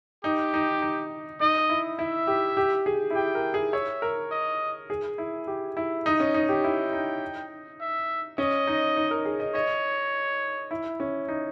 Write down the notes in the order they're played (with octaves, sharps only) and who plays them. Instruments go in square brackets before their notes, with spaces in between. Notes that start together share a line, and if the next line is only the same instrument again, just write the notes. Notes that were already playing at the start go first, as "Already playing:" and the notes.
[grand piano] D#4 [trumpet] G4
[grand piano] D#4
D#4
[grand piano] D#4 [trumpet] D#5
[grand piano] E4
[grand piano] E4 [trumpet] E5
[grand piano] G4
G4
G#4
E4
[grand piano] G4 [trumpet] G5
[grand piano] A#4
G#4
[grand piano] C#5 [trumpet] E5
[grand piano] A#4
[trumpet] D#5
[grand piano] G#4
E4
G4
E4
[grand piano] D#4 [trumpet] D#5
[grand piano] C#4
D#4
G4
[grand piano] E4 [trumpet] G5
[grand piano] D#4
[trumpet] E5
[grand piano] C#4 [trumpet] D#5
[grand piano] D#4
D#4
A#4
G#4
D#5
[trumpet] C#5 [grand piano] D#5
[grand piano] E4
C#4
D#4